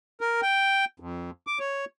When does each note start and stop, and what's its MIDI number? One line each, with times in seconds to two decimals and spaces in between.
0.21 0.41 70
0.42 0.85 79
1.00 1.30 41
1.47 1.59 86
1.59 1.85 73